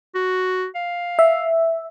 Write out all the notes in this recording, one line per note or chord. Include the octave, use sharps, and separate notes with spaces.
F#4
F5
E5